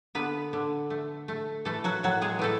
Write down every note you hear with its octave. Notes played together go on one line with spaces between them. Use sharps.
D3 B3 B4
D3
A3
A3
E3 A3 A4
F#3 F#4
A2 F#3 F#4
G#3 G#4
E3 A3 A4